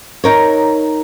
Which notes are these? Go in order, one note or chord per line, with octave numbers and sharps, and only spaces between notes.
D#4 A#4 C#5